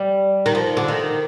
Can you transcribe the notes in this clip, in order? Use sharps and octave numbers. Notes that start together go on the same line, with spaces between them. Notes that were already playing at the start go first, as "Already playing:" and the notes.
Already playing: G3
D#3
F3
D3
D#3